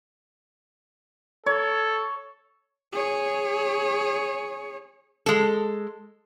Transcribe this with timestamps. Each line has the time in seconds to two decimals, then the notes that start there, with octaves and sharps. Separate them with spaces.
1.46 A4 C#5
2.92 G#4 C#5
5.26 G#3 A4